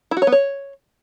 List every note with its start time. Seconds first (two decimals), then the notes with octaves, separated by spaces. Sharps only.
0.11 E4
0.17 F#4
0.22 C#5
0.27 B3
0.32 C#5